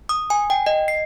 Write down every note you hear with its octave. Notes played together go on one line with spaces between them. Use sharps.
D#6
G#5
G5
D#5
C7